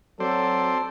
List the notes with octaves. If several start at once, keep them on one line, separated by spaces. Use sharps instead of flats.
F#3 C4 A4 C5 D5